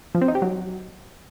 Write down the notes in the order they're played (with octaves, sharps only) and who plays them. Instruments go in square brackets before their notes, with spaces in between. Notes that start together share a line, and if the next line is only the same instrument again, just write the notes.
[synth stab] F3
C4
D#4
G4
F#3